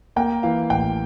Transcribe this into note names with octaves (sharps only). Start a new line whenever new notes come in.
A#3 G5
E3 F5
A1 G5